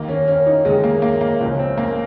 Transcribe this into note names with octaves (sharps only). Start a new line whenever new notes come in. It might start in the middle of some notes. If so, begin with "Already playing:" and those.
Already playing: D#2 D#3 A#3
C#4
C#4
D#4
D#2 D#3 G#3
A#3
A#3
A#3
C#2 C#3 F3 C#4
C4
A#3